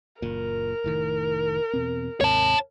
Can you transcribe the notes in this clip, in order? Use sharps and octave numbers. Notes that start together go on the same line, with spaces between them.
F#1 A#2 A#4
F1 A2 D#3
E2 B2 C4
D#2 G#2 C3 C#5 A5